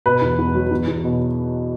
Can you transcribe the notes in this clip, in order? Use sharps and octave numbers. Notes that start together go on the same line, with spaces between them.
B2 B4
E2
E2
F#3
E2
E2
B2